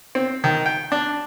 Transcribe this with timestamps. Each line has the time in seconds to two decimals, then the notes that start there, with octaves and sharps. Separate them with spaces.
0.15 C4
0.44 D#3
0.66 G5
0.92 D4